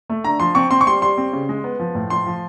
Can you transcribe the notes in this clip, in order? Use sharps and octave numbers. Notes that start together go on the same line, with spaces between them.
A3
D3 A#5
F3 C6
C4 C#6
C4 C6
C#6
G3 C6
G3 C6
C4
C#3
G#3
B3
F3
A2
F3 C6
F3